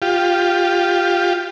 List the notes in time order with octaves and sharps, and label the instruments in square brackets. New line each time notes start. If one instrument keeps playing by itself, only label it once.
[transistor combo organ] F4 G4